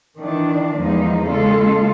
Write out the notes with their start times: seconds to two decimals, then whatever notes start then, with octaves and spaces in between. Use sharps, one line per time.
0.19 D#3 E3 D4
0.77 E2 F3 G3 G#3 A#3 D#4
1.29 C#3 G#3 A#3 F4 A4